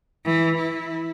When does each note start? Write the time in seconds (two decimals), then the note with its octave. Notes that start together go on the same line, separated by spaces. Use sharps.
0.25 E3
0.57 E4